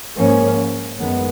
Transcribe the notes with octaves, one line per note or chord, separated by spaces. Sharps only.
G#2 F3 A#3 C#4
F#2 D#3 G#3 B3